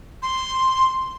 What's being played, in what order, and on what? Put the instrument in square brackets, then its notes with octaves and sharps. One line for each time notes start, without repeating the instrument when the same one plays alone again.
[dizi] C6